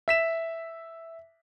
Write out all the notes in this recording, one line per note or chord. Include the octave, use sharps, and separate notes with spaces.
E5 B6 E7